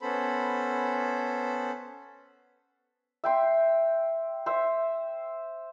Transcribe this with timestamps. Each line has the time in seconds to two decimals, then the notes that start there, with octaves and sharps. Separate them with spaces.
0.01 B3 C#4 A4 C5 B5
3.24 E5 G5 C6
4.46 C5 E5